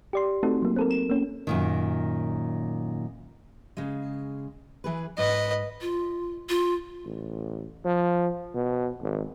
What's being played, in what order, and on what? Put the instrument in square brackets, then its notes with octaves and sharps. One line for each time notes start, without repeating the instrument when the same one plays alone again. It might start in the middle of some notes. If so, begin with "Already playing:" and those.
[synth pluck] G4 D5 C6
A3 C4 D#4 F#4 A4
F#3 A#3
C4 A4 A#4
E7
A#3 C#4
[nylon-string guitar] F#2 A#2 D#3
[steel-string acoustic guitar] C#3 G#3
E3 G#4 B4
[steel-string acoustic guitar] G#2 [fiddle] B4 D#5
[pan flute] F4
F4
[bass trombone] A1
F3
B2
G#1